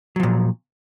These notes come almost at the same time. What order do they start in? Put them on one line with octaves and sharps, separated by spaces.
F#3 F3 A#2